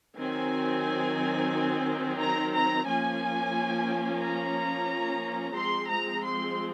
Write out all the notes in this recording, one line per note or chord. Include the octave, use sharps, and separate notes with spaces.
D#3 F#3 C4 G#5
A#5
A#5
F3 A#3 C#4 G#5
A#5
F3 G#3 C4 C6
A#5
C6